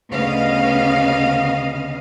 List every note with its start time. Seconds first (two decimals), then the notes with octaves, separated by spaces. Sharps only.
0.11 D2 C#3 B3 D#5 F5